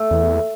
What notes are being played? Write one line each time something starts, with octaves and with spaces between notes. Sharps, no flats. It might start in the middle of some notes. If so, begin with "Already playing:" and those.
Already playing: A3
E2